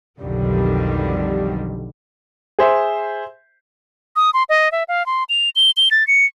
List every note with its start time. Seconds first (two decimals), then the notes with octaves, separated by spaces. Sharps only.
0.21 B1 F2 D3 D#3 F#3 G3
2.59 G#4 C5 E5
4.16 D#6
4.34 C6
4.49 D#5
4.72 E5
4.88 F5
5.06 C6
5.29 F7
5.56 G7
5.77 G7
5.91 A6
6.07 C#7